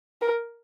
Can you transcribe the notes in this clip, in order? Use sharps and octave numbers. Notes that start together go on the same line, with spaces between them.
A#4